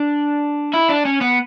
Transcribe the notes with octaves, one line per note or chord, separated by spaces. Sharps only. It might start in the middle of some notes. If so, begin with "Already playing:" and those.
Already playing: D4
E4
D4
C#4
B3